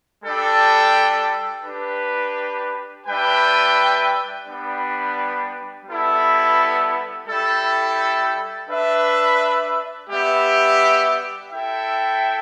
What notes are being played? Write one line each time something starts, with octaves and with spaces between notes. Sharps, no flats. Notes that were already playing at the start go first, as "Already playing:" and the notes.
G3 D4 A4 G5
D4 G4 B4
G3 D4 B4 E5 G5
G3 B3 D4 B4 G5
G3 B3 E4 A4
G3 E4 A4 E5 G5
D4 B4 E5
G3 B3 G4 E5
E4 A4 E5 G5